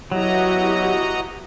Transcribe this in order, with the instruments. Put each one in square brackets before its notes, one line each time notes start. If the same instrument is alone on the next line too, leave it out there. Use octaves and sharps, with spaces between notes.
[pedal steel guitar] F#3 [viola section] B3 E4 G4 [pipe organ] F#4 D#5 A#5